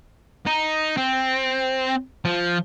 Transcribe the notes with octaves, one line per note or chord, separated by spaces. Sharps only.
D#4
C4
F3